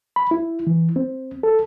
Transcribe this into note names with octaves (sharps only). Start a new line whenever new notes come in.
B5
E4
E3
C4
A4